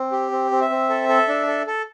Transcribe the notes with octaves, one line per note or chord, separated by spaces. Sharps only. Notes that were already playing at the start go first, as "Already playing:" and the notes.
Already playing: C4
G4
C4
C4
E5
C4
A4
A4
D4
A4
A4